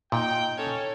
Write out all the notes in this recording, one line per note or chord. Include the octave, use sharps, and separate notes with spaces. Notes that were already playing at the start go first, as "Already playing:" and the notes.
A#2 D#4 G5
C#4 A4 C#5